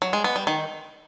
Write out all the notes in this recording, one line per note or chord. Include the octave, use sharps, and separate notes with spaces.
F#3
G#3
B3
G3
D#3